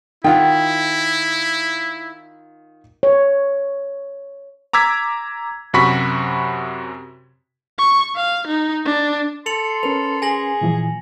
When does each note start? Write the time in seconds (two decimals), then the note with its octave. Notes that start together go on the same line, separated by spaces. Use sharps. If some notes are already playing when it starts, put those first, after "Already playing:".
0.24 D#3 E4 F4 F#5 G5
3.03 C#5
4.73 A#5 D6 E6 G#6 B6
5.74 F#2 C3 F#4 B5 C#6 B6
7.78 C#6
8.16 F5
8.47 D#4
8.85 D4
9.46 A4 C6 C#7 F7 F#7
9.83 C#4 A#4 B4 F7
10.22 G#4 G#5 A#6 F#7
10.61 A#2 E3 F3